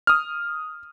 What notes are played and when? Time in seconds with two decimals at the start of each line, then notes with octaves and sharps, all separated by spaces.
0.07 D#6 F6